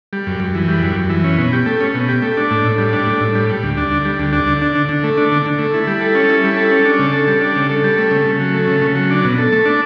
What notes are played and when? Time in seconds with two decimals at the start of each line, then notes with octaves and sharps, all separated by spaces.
0.13 G3
0.27 F#2
0.40 F#2
0.55 E3
0.68 G3
0.83 F#2
0.96 F#2
1.10 E3
1.24 C#4
1.38 B2
1.53 G4
1.66 A3
1.81 C#4
1.95 B2
2.08 G4
2.22 A3
2.37 D4
2.51 A2
2.65 A2
2.78 G3
2.93 D4
3.07 A2
3.21 A2
3.35 G3
3.49 G3
3.63 D2
3.77 D4
3.91 D3
4.05 G3
4.19 D2
4.33 D4
4.47 D3
4.62 D4
4.75 D3
4.89 D3
5.04 A3
5.17 D4
5.32 D3
5.46 D3
5.59 A3
5.74 E4
5.87 G3
6.01 A4
6.15 C#4
6.29 E4
6.44 G3
6.57 A4
6.72 C#4
6.85 D4
6.99 C#3
7.13 A4
7.27 G3
7.41 D4
7.56 C#3
7.69 A4
7.84 G3
7.98 A3
8.11 C#3
8.26 C#3
8.40 F#3
8.54 A3
8.67 C#3
8.82 C#3
8.95 F#3
9.10 D4
9.25 B2
9.38 A4
9.52 A3
9.66 D4